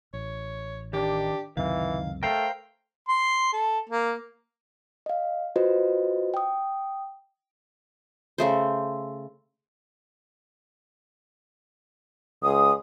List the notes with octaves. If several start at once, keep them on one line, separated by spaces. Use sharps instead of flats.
A1 C#5
D#3 D4 G4
C#2 F#2 C3 D#3 E3 F5
A3 A#4 C5 F5 G5
C6
A4
A#3
D#5 F5
F4 F#4 B4 C5 D#5
G5 D#6
C#3 A3 C5
C#2 D#6